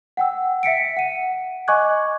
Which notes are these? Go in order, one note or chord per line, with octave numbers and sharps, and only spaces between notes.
F#5 G5 E6
E5 B6 C#7 D7
F#5 D#7
D#5 G#5 C#6 D6 F#6 G#6